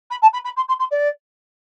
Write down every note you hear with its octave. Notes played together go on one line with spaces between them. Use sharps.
B5
A5
B5
B5
C6
C6
C6
D5